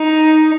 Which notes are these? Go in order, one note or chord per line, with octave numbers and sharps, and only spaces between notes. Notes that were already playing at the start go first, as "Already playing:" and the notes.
Already playing: D#4